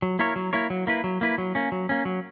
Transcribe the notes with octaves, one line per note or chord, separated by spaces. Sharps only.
F#3
A#3 E4 A#4 C#5
F#3
A#3 E4 A#4 C#5
F#3
A#3 E4 B4
F#3
A#3 E4 B4
F#3
A#3 C#4
F#3
A#3 C#4
F#3